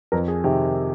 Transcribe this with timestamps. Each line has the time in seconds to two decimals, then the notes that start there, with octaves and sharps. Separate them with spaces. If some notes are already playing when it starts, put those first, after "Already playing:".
0.12 F2 A#4
0.28 G#4
0.44 C3 D#3 G4